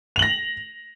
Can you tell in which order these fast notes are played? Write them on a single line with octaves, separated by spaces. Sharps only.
F7 F#7 A#6